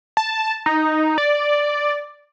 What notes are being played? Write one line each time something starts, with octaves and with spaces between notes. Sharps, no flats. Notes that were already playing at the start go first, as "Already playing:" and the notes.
A5
D#4
D5